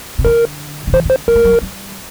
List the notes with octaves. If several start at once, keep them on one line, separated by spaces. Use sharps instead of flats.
C3
D3 A#4
D3
D#3 C5
D3 C5
F3 A#4
G#3
G3
F3
G3